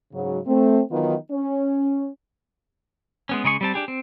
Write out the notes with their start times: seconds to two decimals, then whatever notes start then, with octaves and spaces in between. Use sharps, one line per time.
0.13 G#2 C#3 F#3
0.47 A3 C4
0.91 D#3 E3 F#3 B3 D#4 F4
1.31 C#4
3.29 G#3 B3 C#4
3.44 C#3 G#3 G#4 C#6
3.61 G3 C4 A5
3.74 D4 G4 G#4
3.88 C4